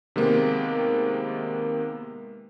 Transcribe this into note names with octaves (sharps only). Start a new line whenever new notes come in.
C3 D#3 G#3 A#3 B3